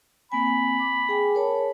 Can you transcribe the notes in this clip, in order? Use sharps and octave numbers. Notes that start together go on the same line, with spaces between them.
A#3 C4 G#5 B5
D6
G#4 G5 G#5
A#4 C#5 A5